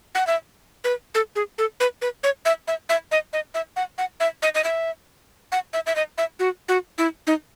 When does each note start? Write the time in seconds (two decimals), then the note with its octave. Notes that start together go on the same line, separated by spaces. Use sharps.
0.15 F#5
0.27 E5
0.84 B4
1.15 A4
1.36 G#4
1.58 A4
1.80 B4
2.02 B4
2.24 C#5
2.45 E5
2.68 E5
2.89 E5
3.12 D#5
3.33 D#5
3.54 E5
3.76 F#5
3.98 F#5
4.20 E5
4.42 D#5
4.55 D#5
4.64 E5
5.52 F#5
5.73 E5
5.86 E5
5.96 D#5
6.18 E5
6.39 F#4
6.69 F#4
6.98 E4
7.27 D#4